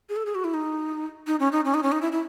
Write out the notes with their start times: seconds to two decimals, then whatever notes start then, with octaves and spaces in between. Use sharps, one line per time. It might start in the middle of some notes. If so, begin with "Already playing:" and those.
0.09 G#4
0.16 A4
0.26 G#4
0.35 F#4
0.44 E4
0.54 D#4
1.27 D#4
1.40 C#4
1.52 D#4
1.65 C#4
1.74 D#4
1.83 C#4
1.92 D#4
2.02 E4
2.12 E4